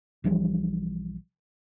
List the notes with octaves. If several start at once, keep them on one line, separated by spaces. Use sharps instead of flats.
B1 E3 F3 G3